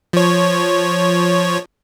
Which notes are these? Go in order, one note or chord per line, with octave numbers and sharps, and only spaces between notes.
F3 C#5